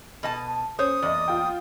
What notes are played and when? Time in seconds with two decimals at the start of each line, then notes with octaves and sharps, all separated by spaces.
0.23 B2 D#5 A5
0.79 C#4 C5 C#5 D#6
1.02 E2 D5 D#5
1.28 F4 G5